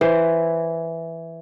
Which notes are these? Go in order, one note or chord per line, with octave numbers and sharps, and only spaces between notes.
E3 C5